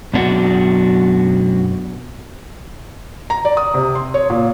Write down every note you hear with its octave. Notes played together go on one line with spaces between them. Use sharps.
F#2 B2 D4 F#4
A#5
D5
D#6
C3
C6
C#5
A#2